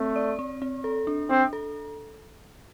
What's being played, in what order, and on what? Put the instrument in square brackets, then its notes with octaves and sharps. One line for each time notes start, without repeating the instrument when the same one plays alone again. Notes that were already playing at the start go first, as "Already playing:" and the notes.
Already playing: [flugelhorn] A3 [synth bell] C4
[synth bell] D5
C4
C4
A4
D4
[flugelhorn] C4 [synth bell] D4
[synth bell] A4